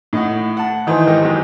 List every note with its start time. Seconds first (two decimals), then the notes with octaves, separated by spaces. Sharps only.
0.13 A2 D#4 D#5 F#5
0.57 F#5 A5
0.87 D#3 E3 D#4 C5
1.07 G#2 G4 A#4 D#5 G5
1.23 A1 F#2 G#3